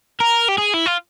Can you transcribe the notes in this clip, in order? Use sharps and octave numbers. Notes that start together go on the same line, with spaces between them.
A#4
G4
G#4
E4
F4